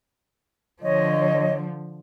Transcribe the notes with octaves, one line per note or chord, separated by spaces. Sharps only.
D3 F3 C#5 D#5